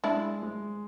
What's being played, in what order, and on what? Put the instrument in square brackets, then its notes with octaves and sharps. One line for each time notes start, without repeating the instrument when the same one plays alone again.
[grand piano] G#3 [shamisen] D4 E4
[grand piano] G#3